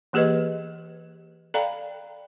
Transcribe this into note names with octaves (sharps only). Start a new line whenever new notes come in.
E3 A#3 G4 G#4 B4 D#5
A4 D5 F5 G5 A#5 B5